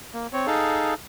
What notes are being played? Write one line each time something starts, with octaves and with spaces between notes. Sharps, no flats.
A#3
C4 C#5
D#4 G#4 A4 F5